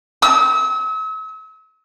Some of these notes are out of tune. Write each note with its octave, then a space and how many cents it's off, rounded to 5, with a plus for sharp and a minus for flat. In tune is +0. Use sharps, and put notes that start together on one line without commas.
E6 -40